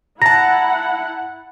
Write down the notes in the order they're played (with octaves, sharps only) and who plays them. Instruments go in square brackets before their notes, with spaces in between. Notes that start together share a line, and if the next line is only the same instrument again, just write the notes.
[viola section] E4 F#5 [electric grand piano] A5 A#5 [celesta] A#6